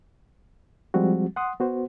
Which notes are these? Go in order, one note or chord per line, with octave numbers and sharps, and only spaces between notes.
F3 G3 G#3 C4 F#4
F#5 C6 D#6
B3 F#4 C5